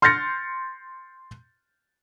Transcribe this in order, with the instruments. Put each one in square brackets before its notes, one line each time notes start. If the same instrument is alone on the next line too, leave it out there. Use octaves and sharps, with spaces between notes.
[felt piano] C6 F6 G6 A6 A#6 C#7